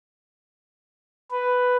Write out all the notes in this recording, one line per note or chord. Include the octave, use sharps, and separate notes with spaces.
B4